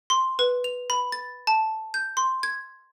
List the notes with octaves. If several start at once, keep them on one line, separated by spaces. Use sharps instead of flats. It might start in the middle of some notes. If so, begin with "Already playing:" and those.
C6
B4
F7
B5
A6
A5
G6
C6
G#6